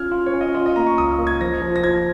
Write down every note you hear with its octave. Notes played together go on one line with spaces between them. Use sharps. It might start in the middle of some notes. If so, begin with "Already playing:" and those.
Already playing: C#4 F4 F6 G#6
F4
C#5
C#4
D#5
F4 D#5
D#5
A#3 A#5
C#6
C#2 D#6
D#6
A#3
G#6
F3 A#6
F3
A#6
F3 G#6